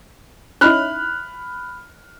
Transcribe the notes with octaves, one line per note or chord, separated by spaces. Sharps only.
C#4 D#4 E4 B5 F6 F#6